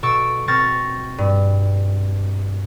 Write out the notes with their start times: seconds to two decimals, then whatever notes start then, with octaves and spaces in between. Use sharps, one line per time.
0.03 B2 A4 C#6 E6 D7
0.47 B2 C4 C#6 F6 A6 A#6
1.18 G2